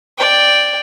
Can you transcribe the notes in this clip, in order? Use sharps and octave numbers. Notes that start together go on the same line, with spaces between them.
D5 G5